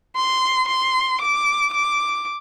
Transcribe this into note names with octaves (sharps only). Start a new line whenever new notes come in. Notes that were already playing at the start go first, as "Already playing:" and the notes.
C6
C6
D6
D6